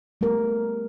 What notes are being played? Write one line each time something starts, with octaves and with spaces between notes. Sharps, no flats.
G3 A3 B3 A#4